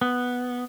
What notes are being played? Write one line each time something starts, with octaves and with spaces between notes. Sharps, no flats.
B3